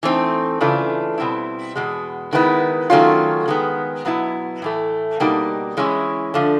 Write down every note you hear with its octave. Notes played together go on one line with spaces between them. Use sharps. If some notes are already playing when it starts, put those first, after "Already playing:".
E3 A3 C4 D#4
C#3 E3 A3 D4 F4
B2 G3 C4 E4
E2 B2 G#3
D#3 G#3 B3 E4
D#3 F#3 A3 C#4 F4
D#3 G#3 B3
B2 F#3 B3 E4
A2 E3 A3
B2 G3 A#3 D#4 F#4
E3 G#3 C#4 E4
D3 F3 A3